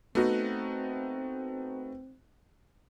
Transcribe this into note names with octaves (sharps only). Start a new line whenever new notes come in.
A3 B3 C4 D#4 F#4